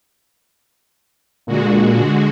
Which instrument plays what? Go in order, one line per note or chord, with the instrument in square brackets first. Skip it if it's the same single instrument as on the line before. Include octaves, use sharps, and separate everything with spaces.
[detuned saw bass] A#2 [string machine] D3 G#3 F#4